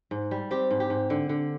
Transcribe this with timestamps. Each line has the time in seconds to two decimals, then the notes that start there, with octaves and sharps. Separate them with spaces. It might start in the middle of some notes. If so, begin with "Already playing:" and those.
0.11 G#2
0.31 G3
0.51 C4 G4
0.71 G#2
0.80 G4
0.90 G#2
1.10 D3
1.29 D3